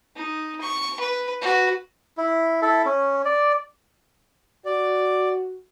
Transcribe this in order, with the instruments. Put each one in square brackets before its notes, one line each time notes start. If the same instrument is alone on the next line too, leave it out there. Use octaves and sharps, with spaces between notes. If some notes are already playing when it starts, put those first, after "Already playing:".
[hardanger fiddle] D#4
C#6
B4
F#4 B4
[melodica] E4
E4 A4
C#4
D5
[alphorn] F#4 [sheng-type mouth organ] D5